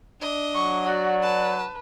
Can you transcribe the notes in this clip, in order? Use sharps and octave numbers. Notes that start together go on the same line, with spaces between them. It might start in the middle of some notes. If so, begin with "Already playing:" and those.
D4 D#5
F#3 C#6
F#4 D5
B4 A5